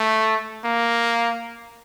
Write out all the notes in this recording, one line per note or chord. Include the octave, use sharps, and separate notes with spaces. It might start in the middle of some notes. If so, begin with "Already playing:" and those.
Already playing: A3
A#3